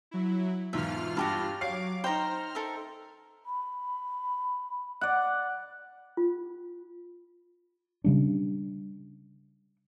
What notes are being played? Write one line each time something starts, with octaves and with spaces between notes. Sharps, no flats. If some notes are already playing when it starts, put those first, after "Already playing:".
F#3 E4
E2 G#2 B2 F4 E5 F6
G2 F#4 G4 A5
F#3 C#5 F5 D6 C7
D#4 C5 G5 A#5 F6
A4 A#4 E5
B5
D5 F#5
F4
C#3 G3 D4